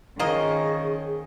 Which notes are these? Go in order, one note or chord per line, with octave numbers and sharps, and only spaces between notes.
D#3 F3 A#3 C#4 G#4 D#5